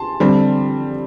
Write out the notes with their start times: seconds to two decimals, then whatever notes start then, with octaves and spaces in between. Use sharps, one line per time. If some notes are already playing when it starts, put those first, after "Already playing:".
Already playing: A5 C6
0.20 D3 G3 C4